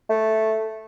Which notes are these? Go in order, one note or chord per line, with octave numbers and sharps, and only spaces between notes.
A3